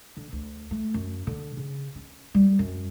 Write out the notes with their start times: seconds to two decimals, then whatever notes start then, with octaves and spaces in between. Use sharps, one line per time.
0.17 D3
0.33 D2
0.71 A3
0.94 F#2
1.27 D3
1.57 C#3
1.95 C#4
2.35 G3
2.59 F#2